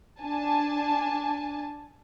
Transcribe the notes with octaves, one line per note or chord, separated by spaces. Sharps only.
D4 G#5 A5